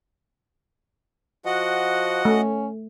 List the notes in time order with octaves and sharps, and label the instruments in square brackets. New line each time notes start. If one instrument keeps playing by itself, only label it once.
[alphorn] F3 [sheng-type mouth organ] F#4 D#5 F#5
[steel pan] A3 [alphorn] C#4